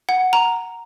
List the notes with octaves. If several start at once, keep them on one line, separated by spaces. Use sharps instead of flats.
F#5
A#5